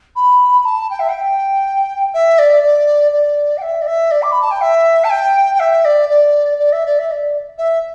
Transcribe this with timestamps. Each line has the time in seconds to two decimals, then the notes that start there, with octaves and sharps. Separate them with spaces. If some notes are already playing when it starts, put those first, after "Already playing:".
0.16 B5
0.61 B5
0.65 A5
0.90 G5
0.99 E5
1.09 G5
2.14 E5
2.38 D5
2.63 D5
3.12 D5
3.57 G5
3.62 E5
3.82 D5
3.87 E5
4.11 D5
4.22 D6
4.32 B5
4.41 A5
4.51 G5
4.61 E5
5.04 A5
5.10 G5
5.54 G5
5.60 E5
5.85 D5
6.09 D5
6.59 D5
6.72 E5
6.86 D5
6.99 E5
7.11 D5
7.58 E5